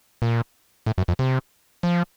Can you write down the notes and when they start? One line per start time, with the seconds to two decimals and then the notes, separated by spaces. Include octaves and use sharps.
0.22 A#2
0.86 A2
0.98 F#2
1.08 F2
1.19 C3
1.83 F3